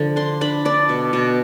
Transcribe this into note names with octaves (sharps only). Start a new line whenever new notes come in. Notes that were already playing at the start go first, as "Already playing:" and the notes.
Already playing: D3 F3
D4 C6
D4 B5
D4 D5
B2
B2